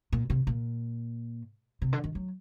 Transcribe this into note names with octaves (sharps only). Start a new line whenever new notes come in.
A#2
C3
A#2
C3
D3
D#3
F#3